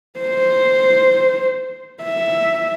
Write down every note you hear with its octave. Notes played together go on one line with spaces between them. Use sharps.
C5
E5